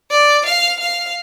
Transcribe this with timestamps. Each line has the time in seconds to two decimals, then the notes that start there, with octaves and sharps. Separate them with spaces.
0.11 D5
0.45 F5
0.80 F5